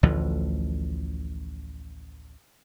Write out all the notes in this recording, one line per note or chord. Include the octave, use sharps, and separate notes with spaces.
A1 D2 A2 F3